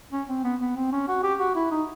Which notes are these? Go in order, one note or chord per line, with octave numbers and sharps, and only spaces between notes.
C#4
C4
B3
B3
C4
C#4
F#4
G4
F#4
E4
D#4